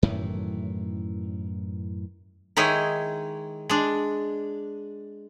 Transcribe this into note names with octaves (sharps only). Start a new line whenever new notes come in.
F#2 A2 D#3 E3
D#3 G#3 D#4 E4 C#5 D#5
G#3 D4